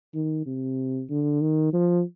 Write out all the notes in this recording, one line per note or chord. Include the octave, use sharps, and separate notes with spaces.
D#3
C3
D3
D#3
F3